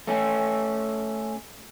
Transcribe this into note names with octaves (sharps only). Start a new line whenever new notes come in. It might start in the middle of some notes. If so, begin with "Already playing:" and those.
A3 C#4